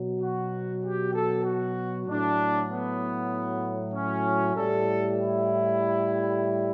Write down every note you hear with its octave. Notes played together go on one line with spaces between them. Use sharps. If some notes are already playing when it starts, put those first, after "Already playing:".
Already playing: B2 F#3
F#4
G4
A4
F#4
A2 F#3 D4
B3
C#4
A2 G3 A4
E4